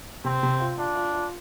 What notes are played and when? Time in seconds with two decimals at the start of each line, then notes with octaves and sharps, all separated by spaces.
0.24 C3 C4
0.43 C3
0.60 F4
0.78 D4 F4
0.96 F4
1.14 F4